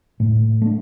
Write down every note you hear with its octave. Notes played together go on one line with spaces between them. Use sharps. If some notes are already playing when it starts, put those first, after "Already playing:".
A2
A3 D4